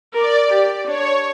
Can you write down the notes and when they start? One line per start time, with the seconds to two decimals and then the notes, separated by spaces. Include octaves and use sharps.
0.13 A#4 D5
0.50 G4
0.87 D4 C#5